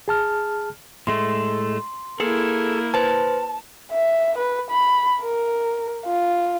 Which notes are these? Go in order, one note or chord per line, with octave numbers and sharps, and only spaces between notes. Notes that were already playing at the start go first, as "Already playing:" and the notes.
G#4 A5 F6
A2 G#3 A3 C6
A#3 E4 G#4 A4
B4 C5 A5
E5
B4
B5
A#4
F4